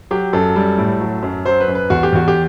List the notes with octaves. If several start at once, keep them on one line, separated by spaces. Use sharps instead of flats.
F#3 G4
F#2 A4
G3
A2
F#3
F#2
F#3 C5
B4
F#2
B4
E2 F#4
G4
E2 F#4
G4